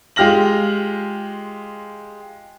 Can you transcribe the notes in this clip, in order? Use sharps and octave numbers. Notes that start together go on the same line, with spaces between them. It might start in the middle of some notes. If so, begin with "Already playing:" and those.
G#3 F4 G4 F6 A#6 F#7